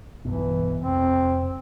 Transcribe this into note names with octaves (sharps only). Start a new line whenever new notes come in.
B1 G2 B2 E3
F1 C4